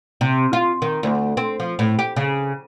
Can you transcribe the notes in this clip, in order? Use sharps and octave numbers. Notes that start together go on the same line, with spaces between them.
C3
F4
D#3
D2
C4
F3
A2
G4
C#3